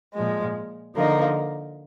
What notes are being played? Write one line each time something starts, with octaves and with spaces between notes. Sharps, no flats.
A#2 F3 G#3
D3 F3 A#3 D#4